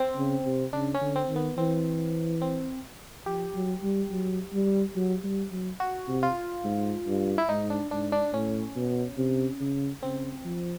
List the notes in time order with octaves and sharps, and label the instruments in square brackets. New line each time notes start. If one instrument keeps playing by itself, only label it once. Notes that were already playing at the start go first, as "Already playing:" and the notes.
Already playing: [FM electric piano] C4
[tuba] C#3
C3
[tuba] C#3 [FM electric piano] D4
[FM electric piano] C#4
[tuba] D3
[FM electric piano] C4
[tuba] D#3
[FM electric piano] B3
[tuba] E3 [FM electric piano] C4
[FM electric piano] C4
[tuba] F3 [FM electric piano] G4
[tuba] F#3
G3
F#3
G3
F#3
G3
F#3
[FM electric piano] F#4
[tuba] C3
[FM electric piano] F4
[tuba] G#2
G2
[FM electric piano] E4
[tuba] G#2 [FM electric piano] D#4
[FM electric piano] D4
[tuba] G#2 [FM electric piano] D4
[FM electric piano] D4
[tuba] A2 [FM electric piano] C#4
[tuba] B2
C3
C#3
[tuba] C#3 [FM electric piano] C4
[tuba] F3